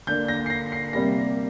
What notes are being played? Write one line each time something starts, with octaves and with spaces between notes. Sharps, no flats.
D3 A#3 D4 G6
A#6
C7
A#6
C7
C3 G3 A#3 A#6